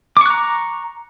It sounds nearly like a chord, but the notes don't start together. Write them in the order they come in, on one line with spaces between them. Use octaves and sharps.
D6 C#6 F#6 A#5